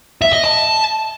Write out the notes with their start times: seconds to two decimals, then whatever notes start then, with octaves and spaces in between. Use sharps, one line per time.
0.22 E5
0.33 D#5
0.44 A5